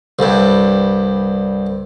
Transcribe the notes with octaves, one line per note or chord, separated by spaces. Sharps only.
C2 G2